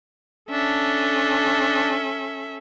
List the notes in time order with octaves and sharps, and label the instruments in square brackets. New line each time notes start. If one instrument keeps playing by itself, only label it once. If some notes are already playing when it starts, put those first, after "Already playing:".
[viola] C#4 A4 [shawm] D4 [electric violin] E5